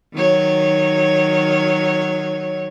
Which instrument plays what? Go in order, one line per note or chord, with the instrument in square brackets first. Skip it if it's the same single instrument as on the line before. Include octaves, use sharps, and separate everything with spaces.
[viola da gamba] D#3 F#3 C#5